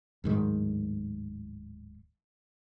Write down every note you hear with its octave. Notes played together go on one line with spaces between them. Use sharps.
D1 G#2 D#3